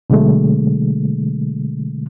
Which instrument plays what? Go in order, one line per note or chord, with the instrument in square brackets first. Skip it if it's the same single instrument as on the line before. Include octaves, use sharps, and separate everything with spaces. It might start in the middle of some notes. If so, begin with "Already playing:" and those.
[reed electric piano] B2 D3 F#3 G#3 A3